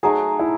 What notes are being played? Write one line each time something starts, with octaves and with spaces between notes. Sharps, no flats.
F#3 A3 D#4 G#4
E4